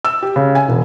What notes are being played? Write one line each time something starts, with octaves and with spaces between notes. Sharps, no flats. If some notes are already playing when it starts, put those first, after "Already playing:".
E6
G4
C#3
G#5
E1